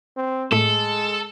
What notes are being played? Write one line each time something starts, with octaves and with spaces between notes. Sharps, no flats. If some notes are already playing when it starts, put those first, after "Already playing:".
C4
A2 G#3 A3 A4